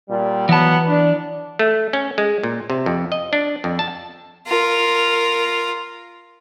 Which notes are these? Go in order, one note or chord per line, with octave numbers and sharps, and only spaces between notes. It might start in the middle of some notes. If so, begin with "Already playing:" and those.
A#2 G3
E3 F#3 B3 A5
D4
A3
C#4
G#3
A#2
C3
F2
D#5
D4
F2
A5
F4 A#4